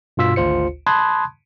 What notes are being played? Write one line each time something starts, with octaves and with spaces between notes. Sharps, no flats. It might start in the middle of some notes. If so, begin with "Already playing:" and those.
G2 B2 F4 E6 B6
G#1 D2 F4 C5 C#7
A5 B5 C6 D#6 F#6 G#6